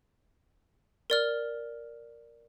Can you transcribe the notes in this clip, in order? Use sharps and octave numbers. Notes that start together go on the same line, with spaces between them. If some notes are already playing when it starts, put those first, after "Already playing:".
A#4 D5 F6